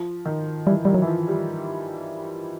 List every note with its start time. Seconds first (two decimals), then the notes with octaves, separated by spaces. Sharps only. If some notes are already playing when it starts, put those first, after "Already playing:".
Already playing: F3
0.25 D#3
0.67 E3 G3
0.85 D#3 G3
0.94 F#3
1.02 E3
1.07 F3
1.28 G3